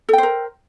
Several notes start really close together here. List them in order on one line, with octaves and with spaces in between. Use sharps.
A4 G5 C5 A#4